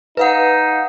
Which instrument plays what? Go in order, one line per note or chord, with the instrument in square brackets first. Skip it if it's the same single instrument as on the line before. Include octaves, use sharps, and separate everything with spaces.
[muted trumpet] D#4 [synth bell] B4 F5 F#5